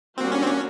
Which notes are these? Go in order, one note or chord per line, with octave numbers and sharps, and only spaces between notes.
G3 A#3 C4 D4 F#4
C#4
C4
C#4